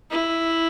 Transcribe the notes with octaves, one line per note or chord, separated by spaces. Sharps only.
E4